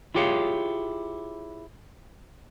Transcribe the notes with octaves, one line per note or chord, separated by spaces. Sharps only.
E4 F4 G4 G#4 C#5 F5